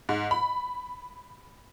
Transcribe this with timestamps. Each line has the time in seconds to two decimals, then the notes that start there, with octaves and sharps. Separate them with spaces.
0.09 G#2
0.31 B5